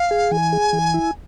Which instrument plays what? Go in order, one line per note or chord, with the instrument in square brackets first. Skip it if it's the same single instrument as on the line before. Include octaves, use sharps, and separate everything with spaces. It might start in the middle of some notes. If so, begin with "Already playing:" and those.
Already playing: [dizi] F5
[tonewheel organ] G#4
[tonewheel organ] E3 [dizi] G#5
[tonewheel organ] G#4
E3
E4